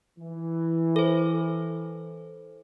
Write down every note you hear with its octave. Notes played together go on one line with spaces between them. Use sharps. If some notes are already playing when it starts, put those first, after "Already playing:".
E3
A4 C5